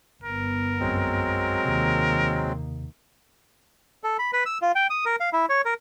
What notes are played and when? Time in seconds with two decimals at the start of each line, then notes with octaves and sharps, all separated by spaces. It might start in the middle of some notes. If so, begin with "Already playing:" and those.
0.24 G1 B3 A#4
0.80 A#1 F#2 F#3 G#3 C4
1.65 D#2 C3 D#3 A#3
4.04 A4
4.19 B5
4.33 B4
4.46 E6
4.62 F4
4.75 G5
4.90 D#6
5.06 A#4
5.20 F5
5.33 E4
5.49 C#5
5.65 A#4